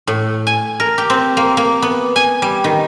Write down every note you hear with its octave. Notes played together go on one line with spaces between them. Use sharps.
A2
G#5
A#4
G4
C4
A#3
A#3
B3
G#5
G3
D#3